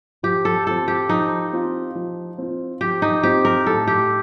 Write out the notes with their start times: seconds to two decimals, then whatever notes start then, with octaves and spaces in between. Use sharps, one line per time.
0.23 F3 G4
0.45 A4
0.67 C4 F4 A4
0.88 G4
1.09 F3 D#4
1.53 C4 F4
1.95 F3
2.38 C4 F4
2.81 F3 G4
3.02 D#4
3.23 C4 F4 G4
3.45 A#4
3.66 A2 A4
3.88 G4